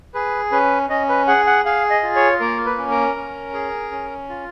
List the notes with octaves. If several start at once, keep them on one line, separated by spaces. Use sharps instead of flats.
G#4 B4
C#4 B4
C#4 D#5
B4
G#4 F#5
F#5
G#4 F5
D#5
F4
C#5
A#3 A#4
B4
C#4
A#4
C#4
G#4
C#4
F4